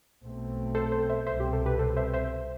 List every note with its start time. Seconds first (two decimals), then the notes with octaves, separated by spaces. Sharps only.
0.22 B1 B2 A3 C4
0.75 A4 C5
0.92 A4 C5
1.10 C5 E5
1.26 C2 B2 G3 C4 C5 E5
1.40 G4
1.53 A4
1.66 G4 B4
1.79 A4 C5
1.97 C5 E5
2.14 C5 E5